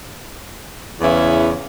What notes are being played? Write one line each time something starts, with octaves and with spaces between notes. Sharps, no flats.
E2 C#3 E3 C#4 E4